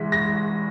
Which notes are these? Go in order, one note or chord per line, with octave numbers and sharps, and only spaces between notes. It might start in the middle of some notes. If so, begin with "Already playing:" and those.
Already playing: G#2 E3 G#3 B6
A#6